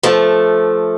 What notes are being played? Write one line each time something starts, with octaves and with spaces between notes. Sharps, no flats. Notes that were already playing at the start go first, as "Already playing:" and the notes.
F3 A3